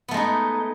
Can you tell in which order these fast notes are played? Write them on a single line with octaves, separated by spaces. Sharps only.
B3 A3 G#3 D#4